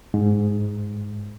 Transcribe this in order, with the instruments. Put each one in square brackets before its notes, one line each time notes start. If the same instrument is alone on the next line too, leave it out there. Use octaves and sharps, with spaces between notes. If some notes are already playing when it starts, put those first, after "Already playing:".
[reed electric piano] G#2